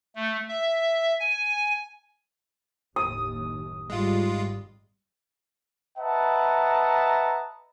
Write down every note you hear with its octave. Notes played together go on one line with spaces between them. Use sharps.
A3
E5
G#5
F#1 D#2 A2 D#6
G#1 G#2 G3 G#3 F4
B4 D#5 E5 F#5 A5 A#5